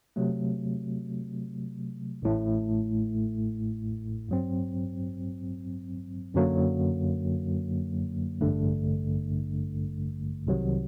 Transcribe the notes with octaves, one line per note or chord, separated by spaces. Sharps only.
C3 F#3 A3
A1 A2 A3
G2 F#3 C4
F#2 D3 F#3 A#3
A1 G2 D3 A3
C2 C3 D#3 F#3